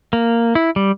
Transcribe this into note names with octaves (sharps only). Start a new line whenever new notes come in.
A#3
E4
G3